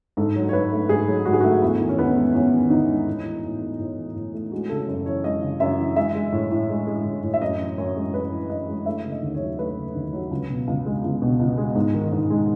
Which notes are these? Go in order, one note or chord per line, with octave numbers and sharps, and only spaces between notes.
G#2 A4
F#3
C#5
G#2 B4
A3
G#2 G#4
F#3
G#2 F#4
G#4
A3 F#4
E2 E4
D#3
C#4
E2 B3
G#3
E2 C#4
D#3
E2 D#4
G#3
A2
E3
A2
A3
A2
E3
A2
A3
G#3 F#4
C#3 A4
F#2
E3 C#5
G#3 D#5
C#3
F#2 E5
E3
G#3 E5
G#3
A2
A2
G#3
G#3
A2
A2
E5
F#2 D#5
E3
F#2 C#5
G#3
F#2 B4
E3
F#2 D#5
G#3
A3 E5
C#3
D#5
D#2
C#5
F#3
A3 B4
C#3
D#2
F#3
C#2
B2
C#2
G#3
C#2
B2
C#2
G#3
G#2
D#3
G#2
G#3